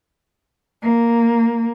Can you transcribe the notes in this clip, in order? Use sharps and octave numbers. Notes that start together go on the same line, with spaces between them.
A#3